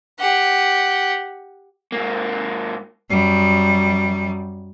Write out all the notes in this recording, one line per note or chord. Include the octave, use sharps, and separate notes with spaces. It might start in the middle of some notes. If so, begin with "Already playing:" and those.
G4 F#5
G#2 A#3
F#2 G3